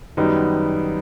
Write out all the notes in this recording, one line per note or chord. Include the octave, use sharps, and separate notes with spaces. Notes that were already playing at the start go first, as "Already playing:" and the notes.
F#2 D#3 G3 B3 D#4